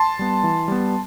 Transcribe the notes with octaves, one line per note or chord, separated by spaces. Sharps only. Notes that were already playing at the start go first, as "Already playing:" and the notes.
Already playing: A5 C6
G3 B3
E3
G3 B3